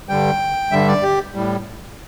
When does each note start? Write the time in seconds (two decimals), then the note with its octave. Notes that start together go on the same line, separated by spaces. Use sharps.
0.09 G2 D3 G3 G5
0.71 G2 D3 G3 E5
0.87 D5
1.03 G4
1.35 A2 G3